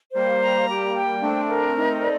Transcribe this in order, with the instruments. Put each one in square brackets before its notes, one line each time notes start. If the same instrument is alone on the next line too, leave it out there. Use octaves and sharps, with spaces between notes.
[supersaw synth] G3 A#3 [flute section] C5
[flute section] A#5
G4
G5
[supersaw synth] A3 C4 [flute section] D4
[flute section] A#4
D#4
D5